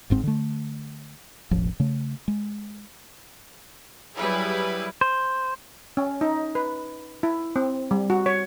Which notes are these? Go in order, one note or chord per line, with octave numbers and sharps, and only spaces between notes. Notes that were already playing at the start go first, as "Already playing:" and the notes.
G1 G#2 C4
D3 A3
E1 A1 F3
C#3 A3
G#3
F#3 G3 E4 G#4 B4
C5
C#4
D#4
B4
E4
C4
G3
F#4
C#5